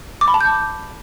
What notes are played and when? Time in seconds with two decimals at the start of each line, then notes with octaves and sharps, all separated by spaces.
0.21 D6
0.28 B5
0.34 A5
0.41 G6